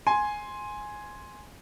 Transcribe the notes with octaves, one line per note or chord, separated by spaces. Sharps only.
G#5 C6